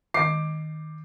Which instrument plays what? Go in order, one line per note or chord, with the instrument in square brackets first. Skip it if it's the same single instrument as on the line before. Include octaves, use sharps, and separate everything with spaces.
[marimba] D#3 [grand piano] D6 C7